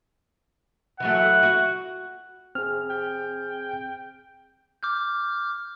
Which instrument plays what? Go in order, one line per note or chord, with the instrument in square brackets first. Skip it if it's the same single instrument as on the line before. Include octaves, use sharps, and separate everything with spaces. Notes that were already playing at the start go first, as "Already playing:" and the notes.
[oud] E3 F#3 A3 [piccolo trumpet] F#5
[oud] F#4
[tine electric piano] C4 G#4 [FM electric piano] F6
[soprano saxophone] G5
[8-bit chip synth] D6 F6 G6